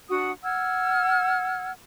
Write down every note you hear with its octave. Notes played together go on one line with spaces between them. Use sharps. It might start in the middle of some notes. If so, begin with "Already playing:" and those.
D4 F#4 F#5 D#6
F#5 E6 F6 G#6